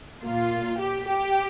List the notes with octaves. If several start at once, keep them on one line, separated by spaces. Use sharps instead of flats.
A#2 A#3 F4
G4
G4